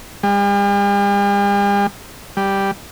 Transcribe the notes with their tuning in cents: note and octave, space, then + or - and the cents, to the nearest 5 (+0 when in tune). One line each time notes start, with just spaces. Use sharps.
G3 +45
G3 +0